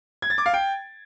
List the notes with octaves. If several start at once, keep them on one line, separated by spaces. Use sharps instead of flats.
G#6
A6
D6
F5
G5